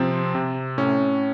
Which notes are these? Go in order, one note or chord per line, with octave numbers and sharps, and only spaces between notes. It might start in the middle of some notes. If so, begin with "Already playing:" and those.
Already playing: C3 F3 C4
C3
A2 C#4